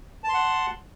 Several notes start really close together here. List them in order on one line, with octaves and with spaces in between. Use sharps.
A5 C6 F#5